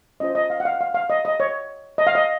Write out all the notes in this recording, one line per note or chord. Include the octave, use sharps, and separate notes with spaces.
C#4 F4 C5 D#5
D#5
F5
F#5
F5
F5
F5
D#5
D#5
C#5
D#5
F5
D#5